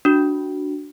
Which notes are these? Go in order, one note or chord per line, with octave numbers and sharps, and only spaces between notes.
D4 F#4